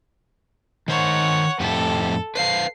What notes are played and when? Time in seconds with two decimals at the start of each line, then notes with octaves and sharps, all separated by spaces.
0.88 D#3 C5 C#5 F#5
1.60 F2 A2 G4 A4
2.35 B4 C5 F5 C7